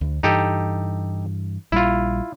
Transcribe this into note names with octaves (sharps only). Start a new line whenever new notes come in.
D2
G2 E3 D#4 G4 A4
A#1 G3 E4 F4